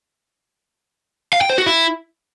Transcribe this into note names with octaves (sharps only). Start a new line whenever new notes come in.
F5
G5
C5
F#4
E4